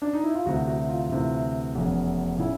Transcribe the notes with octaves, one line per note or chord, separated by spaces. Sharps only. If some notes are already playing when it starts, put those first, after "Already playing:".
D4
D#4
E4
F4
D2 C3 E3 F#4
F#4
F4
D2 C3 E3
F1 E2 C#3
C#3 E4